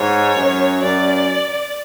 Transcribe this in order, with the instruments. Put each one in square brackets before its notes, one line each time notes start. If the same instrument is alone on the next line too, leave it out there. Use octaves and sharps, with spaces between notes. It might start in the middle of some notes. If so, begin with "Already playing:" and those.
Already playing: [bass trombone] G#2 [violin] C#5
[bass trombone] F#2
[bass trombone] F#2 [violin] D5